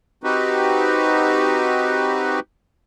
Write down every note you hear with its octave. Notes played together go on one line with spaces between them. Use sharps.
C4 D#4 F#4 G4 B4